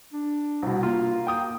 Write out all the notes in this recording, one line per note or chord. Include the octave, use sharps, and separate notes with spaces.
D4
C2 B2
A#3 F4
G5 D#6